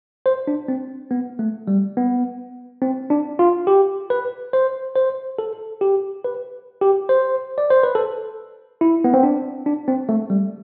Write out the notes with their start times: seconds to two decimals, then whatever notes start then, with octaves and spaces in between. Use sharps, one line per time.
0.26 C5
0.47 D4
0.68 C4
1.11 B3
1.39 A3
1.68 G3
1.97 B3
2.82 C4
3.10 D4
3.39 F4
3.67 G4
4.10 B4
4.53 C5
4.96 C5
5.38 A4
5.81 G4
6.25 B4
6.81 G4
7.09 C5
7.58 D5
7.70 C5
7.83 B4
7.95 A4
8.81 E4
9.04 B3
9.14 C4
9.23 D4
9.66 D4
9.88 C4
10.09 A3
10.30 G3